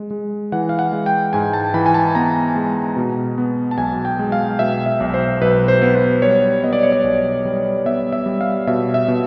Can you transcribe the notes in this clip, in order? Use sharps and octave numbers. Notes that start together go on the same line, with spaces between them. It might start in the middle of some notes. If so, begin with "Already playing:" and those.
Already playing: G#3
G#3
E3 F#5
F5
F#5
G#3
G5
G#2 G#5
A5
E3 B5
G#5
A5
B3 A#5
G#3
B2
B3
A5
B1 G#5
G5
G#3
F5
B2 E5
E5
B1
C5
B1 B4
C5
B3
C5
G3 C#5
B3 D#5
D5
C#5
D5
B1
G3
B3 E5
E5
G3
F5
B2 E5
E5
B2